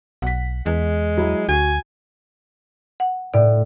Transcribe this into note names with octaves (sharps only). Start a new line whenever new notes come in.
B1 F#5 B6
E2 G#3
F#3 E4
D2 F#4 G#5
F#5
A2 D5